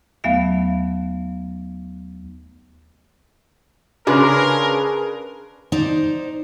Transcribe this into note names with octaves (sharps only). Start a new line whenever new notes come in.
D#2 F#3 A3 B3 E5 F5
C#3 D4 G#4 A#4 B4 C6
D#4 C5 D5